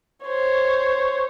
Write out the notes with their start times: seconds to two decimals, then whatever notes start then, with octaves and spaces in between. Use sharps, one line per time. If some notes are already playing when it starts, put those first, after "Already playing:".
0.24 C5 C#5